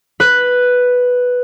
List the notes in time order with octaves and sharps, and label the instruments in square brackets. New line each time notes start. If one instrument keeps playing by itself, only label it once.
[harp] B4